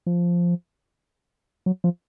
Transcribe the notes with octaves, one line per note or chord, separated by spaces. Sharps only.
F3
F#3
F3